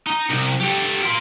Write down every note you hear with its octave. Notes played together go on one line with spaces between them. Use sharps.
D#4
C2
G4 A4
A#4 C6